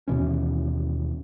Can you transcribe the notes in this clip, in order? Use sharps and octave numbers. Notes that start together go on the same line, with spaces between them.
D#2 B2 E3 C#4